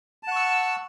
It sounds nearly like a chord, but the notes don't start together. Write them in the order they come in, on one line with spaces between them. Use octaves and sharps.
A5 F#5 C#6 E6